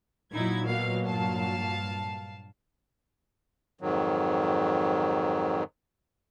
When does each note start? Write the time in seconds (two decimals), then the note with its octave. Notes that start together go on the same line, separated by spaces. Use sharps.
0.33 A#2 F#3 D#4 E4 G#6
0.66 B2 A#3 F5
1.06 G2 F5 A5
3.81 F2 G#2 D#3 F#3